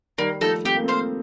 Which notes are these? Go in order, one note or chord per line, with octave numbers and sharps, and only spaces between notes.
D#3 G3 A#3
F3 A3 D#4 A4
C4 G4
A#3
A3 C4 C5 F5